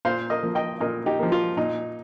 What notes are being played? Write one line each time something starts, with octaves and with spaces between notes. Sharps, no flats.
A#2 C5 F5
A#4 D#5
F3 A#3
D#5 G5
A#2 A#4 D#5
D#4 G4
F3 A#3
F4
A#2 D#4